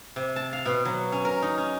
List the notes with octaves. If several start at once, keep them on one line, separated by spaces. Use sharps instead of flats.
C3
A5
F5
B2
F#3
C#4
A#4
D#4
C#4